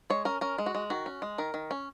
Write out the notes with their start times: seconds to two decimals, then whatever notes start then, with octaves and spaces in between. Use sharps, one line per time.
0.10 G#3 C#5
0.25 C#4 A#4
0.41 C#4 A#4
0.58 G#3
0.66 F#4
0.75 G#3
0.90 D#3 F#4
1.06 C#4
1.22 G#3
1.38 D#3 A#4
1.54 D#3
1.71 C#4